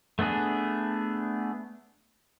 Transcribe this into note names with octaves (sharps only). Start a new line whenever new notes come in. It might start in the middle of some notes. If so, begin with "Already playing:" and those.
A3 B3 D4 G#4